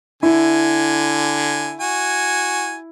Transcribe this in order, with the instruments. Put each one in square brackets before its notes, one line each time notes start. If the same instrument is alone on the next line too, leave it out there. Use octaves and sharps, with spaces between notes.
[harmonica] D3 G#5 [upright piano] E4
[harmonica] F#4 G#5